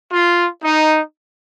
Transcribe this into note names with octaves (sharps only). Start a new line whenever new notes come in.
F4
D#4